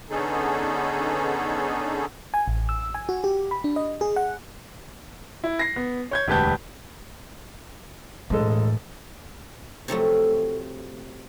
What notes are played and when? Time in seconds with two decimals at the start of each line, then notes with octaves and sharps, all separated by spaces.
0.10 D3 B3 C#4 D#4 G#4 A4
2.34 G#5
2.48 A1
2.69 E6
2.95 G#5
3.09 F#4
3.24 G4
3.51 B5
3.64 D4
3.76 D#5
4.01 G#4
4.16 F#5
5.44 E4
5.59 A#6 C7
5.76 B3
6.11 C#5 G6 G#6
6.28 E1 D2 G4 B4 A5 G6
8.30 E1 A2 G#3 A4
9.88 C3 F3 F#3 A3